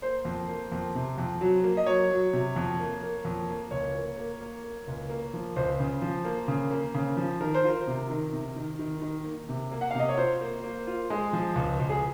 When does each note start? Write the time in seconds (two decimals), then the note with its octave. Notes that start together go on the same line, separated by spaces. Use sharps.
0.02 A#3 C5
0.25 F2
0.49 A#3
0.72 F2
0.95 C3
1.18 F2
1.41 F#3
1.64 A#3
1.77 D#5
1.86 F#3 C#5
2.11 F#3
2.33 C3
2.56 F2
2.80 A#3
3.03 A#3
3.25 F2
3.49 A#3
3.71 C#2 C#5
3.95 A#3
4.18 A#3
4.41 A#3
4.64 A#3
4.87 C#2
5.09 A#3
5.34 F3
5.56 C#2 C5
5.80 C#3
6.02 F3
6.25 A#3
6.48 C#3
6.71 A#3
6.94 C#3
7.17 F3
7.41 D#3 A#4
7.54 C5
7.64 F4 A#4
7.87 C3
8.10 D#3
8.33 C3
8.56 D#3
8.79 D#3
9.02 D#3
9.25 A#3
9.49 C3
9.71 A#3
9.81 F#5
9.91 F5
9.95 C3 D#5
10.09 C#5
10.17 F4 C5
10.41 A#3
10.64 A#3
10.87 F4
11.10 G#3
11.33 F3
11.56 C#2
11.79 C#2
11.90 G#4